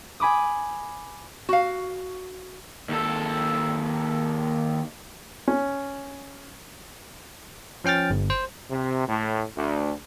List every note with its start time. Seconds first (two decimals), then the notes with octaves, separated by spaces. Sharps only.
0.20 G#5 B5 D6 D#6
1.49 F#4 F5
2.89 D#2 A4
5.48 C#4
7.84 F3 C#4 G5 F6 A6
8.10 G1
8.30 C5
8.71 C3
9.08 A2
9.57 D2